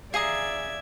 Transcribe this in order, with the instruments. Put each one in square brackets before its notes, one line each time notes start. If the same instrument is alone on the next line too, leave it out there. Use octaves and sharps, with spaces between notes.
[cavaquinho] G#4 A#5 [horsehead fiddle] D5 E5 [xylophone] F5 G#5 D#6 [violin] G#6